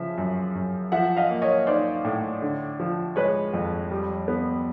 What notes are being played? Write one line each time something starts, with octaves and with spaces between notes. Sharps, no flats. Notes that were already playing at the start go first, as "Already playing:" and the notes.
Already playing: C#3 F3 E5
F#2
F#2
F3 E5 F#5
D#5 F5
A#3
C#5 D#5
D#4 C5 D5
A2
D3
F3
G#3 B4 C#5
F2
G3
B3